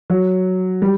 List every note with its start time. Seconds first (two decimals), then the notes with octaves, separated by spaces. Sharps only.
0.10 F#3
0.82 G3